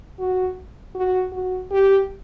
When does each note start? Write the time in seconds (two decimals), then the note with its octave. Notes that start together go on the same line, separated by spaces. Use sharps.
0.19 F#4
0.95 F#4
1.32 F#4
1.71 G4